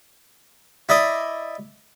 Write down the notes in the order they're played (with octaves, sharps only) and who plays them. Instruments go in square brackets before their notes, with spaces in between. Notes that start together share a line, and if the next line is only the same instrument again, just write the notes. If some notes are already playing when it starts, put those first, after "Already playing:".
[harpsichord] E4 D5 D#5